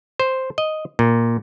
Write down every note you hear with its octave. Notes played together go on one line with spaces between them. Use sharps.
C5
D#5
A#2